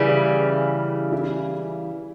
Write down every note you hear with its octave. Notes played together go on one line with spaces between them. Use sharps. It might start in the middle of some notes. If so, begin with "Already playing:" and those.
Already playing: C#3 E3 G3 E4
E4